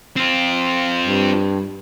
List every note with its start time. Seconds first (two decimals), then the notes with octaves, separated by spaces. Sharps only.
0.16 C4 F4
1.01 G2